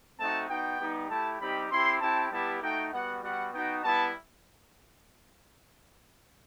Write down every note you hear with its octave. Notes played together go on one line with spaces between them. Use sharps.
A3 C4 D#4 F#4 A5
B3 D#4 F#4 G5
G3 B3 D#4 G4
A3 E4 G4 A5
G3 C4 D#4 G4 B5
C4 E4 G4 C6
C4 E4 G4 A5
G3 B3 E4 G4 A5
A3 D#4 F#4 G5
G3 B3 F#4 F#5
G3 B3 F#4 F#5
B3 D#4 F#4 G5
G3 B3 E4 A5